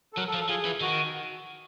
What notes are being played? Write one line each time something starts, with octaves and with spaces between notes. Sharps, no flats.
A4
F#3 A#4
A4
F3
A4
F3 G#4
E3
D#3 F#4